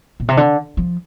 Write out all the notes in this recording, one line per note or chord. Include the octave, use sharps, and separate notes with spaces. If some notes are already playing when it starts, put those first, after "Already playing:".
A#2
C3
D3
F3